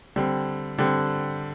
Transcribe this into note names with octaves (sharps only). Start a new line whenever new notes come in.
D3 G3 C4
D3 G3 C4